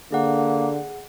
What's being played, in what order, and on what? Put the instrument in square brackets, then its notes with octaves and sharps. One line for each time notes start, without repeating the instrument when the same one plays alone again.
[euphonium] D3 [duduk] A#3 [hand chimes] G#4 F#5